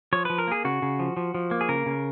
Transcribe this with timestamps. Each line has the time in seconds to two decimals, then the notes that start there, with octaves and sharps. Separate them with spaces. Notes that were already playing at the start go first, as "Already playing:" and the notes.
0.13 F3 C#5
0.25 F3 B4
0.38 A#4
0.47 A#3 G#4
0.65 C#3 F#4
0.82 C#3
0.99 F3
1.17 F3
1.35 F3
1.51 A#3
1.61 G#4
1.69 C#3 A#4
1.86 C#3